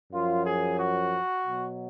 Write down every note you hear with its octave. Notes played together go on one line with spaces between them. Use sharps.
F#2 F3 F4
G#4
F#4
B2 F#3